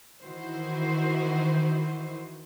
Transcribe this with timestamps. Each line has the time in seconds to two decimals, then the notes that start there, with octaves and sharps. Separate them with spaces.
0.23 D#3 E3 E4 F#4 C5